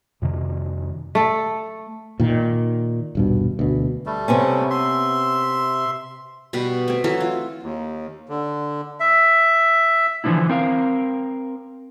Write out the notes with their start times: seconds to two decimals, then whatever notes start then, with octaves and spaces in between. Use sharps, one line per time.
0.22 F2 C3 D#3
1.15 A3 A4
2.20 A#2 D#3
3.15 D#1 G2 B2
3.59 D2 B2
4.06 G3 A3
4.28 C3 B3 C#4
4.70 E5 C6
6.53 B2 G3 B4 B5
6.88 A3 C4
7.04 E3 F#3 A4
7.20 F4
7.63 D#2
8.29 D3
9.00 E5
10.24 D3 E3 F3 A#3 D4 E4
10.50 C4 A#4 F5